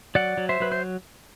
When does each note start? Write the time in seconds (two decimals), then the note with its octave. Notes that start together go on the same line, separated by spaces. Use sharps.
0.15 F#3 D5 F#5
0.38 F#3
0.49 C5 E5
0.60 F#3 B4
0.72 C5